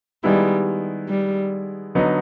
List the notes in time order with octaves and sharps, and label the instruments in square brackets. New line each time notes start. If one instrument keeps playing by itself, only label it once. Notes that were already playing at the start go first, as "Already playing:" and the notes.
[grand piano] D#3 G#3 B3 E4 [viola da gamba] G3
[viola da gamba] G3
[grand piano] D3 F#3 B3 D#4